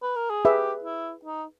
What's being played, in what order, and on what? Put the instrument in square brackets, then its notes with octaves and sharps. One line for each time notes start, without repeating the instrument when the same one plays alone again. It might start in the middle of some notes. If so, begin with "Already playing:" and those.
[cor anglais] B4
A#4
G#4
[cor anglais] G4 [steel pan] G#4 B4 E5
[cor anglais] E4
D#4